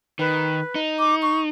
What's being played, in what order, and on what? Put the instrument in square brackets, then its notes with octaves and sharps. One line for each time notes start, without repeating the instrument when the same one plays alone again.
[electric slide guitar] D#3 [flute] B4
[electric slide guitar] D#4
[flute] D6
C#6